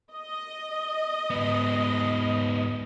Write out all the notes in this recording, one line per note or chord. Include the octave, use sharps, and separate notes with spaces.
D#5
G#2 B3